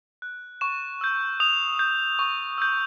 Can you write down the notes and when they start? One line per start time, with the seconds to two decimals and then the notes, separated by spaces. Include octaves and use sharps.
0.22 F#6
0.61 C#6 E7
1.01 E6 G6
1.40 D#6 F7
1.79 G6
2.19 C#6
2.58 E6 G6